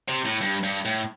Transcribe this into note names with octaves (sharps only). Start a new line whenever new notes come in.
C3
A2
G2
G2
A2